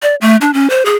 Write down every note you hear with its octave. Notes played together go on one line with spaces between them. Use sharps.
D5
A3
D4
C#4
C5
G#4